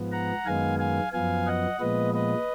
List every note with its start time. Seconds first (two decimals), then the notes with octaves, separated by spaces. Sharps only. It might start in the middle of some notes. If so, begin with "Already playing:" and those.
Already playing: G#2 F3 B3
0.12 F#5 A#5
0.46 F#2 D#3 G#3 B3 F5 G#5
0.79 F5 G#5
1.13 F#2 F3 B3 F5 G#5
1.47 D#5 F#5
1.80 A#2 F3 G#3 B3 B4 D#5
2.14 B4 D#5